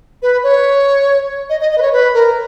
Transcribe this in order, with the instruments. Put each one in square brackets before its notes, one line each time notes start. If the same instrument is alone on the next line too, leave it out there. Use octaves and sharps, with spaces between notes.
[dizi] B4
C#5
D#5
D#5
D#5
B4
C#5
B4
A#4